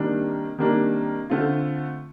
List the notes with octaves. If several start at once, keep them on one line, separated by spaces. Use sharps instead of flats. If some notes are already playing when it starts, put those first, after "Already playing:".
Already playing: C3 D#3 G3 A#3 D4
C3 D#3 G3 A#3 D4
D3 A3 C4 F4